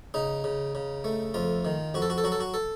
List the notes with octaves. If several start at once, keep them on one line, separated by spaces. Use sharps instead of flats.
C#3 D#4
C#3
C#3
A3
F2 F4
D#3
F2 F#4
A4
F#4
A4
F#3 F#4
A4
F#4
A4